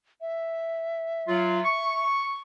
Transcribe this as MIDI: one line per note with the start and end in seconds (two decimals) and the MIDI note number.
0.21 2.04 76
1.28 1.59 54
1.28 1.59 65
1.65 2.40 85